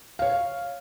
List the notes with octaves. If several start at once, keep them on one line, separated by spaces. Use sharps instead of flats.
C#5 F5